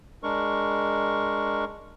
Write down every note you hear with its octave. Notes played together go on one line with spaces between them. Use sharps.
G#3 D4 A#4 C#6